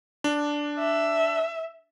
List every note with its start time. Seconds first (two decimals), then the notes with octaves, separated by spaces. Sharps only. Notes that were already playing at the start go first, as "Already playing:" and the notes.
0.24 D4
0.79 E5